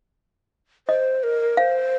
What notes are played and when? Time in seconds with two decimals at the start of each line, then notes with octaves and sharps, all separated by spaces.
0.88 C5 D#5
1.23 A#4
1.57 C5 F5